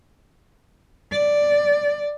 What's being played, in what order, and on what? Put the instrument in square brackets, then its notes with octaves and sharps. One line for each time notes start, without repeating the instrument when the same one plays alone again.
[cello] D5